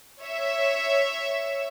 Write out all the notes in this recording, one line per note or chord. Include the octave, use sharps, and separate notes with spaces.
C#5 E5